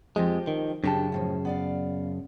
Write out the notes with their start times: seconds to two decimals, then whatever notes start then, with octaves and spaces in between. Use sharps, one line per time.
0.16 F2 F3 G#3 G4
0.47 D#3
0.84 F#2 C#3 D4 G4 G5 A5
1.12 A2 D#3 F3
1.45 B3 D5 F5